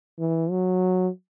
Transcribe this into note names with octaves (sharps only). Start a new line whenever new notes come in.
E3
F#3